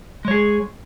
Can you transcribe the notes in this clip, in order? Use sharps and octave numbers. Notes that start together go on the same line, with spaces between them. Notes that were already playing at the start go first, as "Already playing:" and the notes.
G#3 G#4 C#5